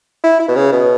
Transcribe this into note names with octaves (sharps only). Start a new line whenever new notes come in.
E4
E4
B2
C#3
B2